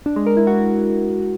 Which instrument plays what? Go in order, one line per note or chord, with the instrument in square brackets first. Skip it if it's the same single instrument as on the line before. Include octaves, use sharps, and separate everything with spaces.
[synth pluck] D4
G#3
A#4
E4
F#4